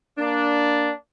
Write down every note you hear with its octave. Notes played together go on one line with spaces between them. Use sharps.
A#3 D4